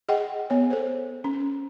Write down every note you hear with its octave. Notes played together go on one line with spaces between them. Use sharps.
G#4 D#5 F#5 G5
B3 C#5
A4 C5
C#4